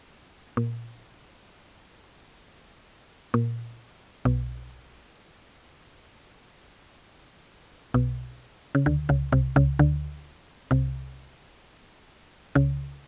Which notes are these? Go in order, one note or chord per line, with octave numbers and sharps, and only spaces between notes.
A#2
A#2
B1 B2
B1 B2
C#3
D2 D3
C#2 C#3
C2 C3
C#2 C#3
D2 D3
C2 C3
C#2 C#3